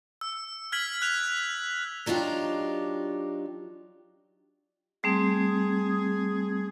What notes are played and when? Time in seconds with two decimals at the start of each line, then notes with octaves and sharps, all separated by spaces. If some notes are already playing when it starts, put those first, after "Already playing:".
0.21 E6
0.72 F6 G#6 B6 F#7
1.02 F#6 F7
2.06 F#3 D4 D#4 F4 G4
5.04 G3 A3 C4 G#4